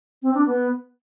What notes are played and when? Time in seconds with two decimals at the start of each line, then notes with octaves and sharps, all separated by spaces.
0.23 C4
0.35 D4
0.46 B3